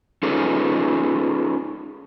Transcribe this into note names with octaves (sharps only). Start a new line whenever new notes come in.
C#4 D#4 F4 G#4 A4 B4